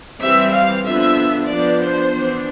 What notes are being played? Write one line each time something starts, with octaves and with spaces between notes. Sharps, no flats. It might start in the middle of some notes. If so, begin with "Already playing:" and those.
E3 G3 C4 E5
F5
D3 F3 B3 D4 E5
F3 B3 D4 D5
C5
E3 B3 D4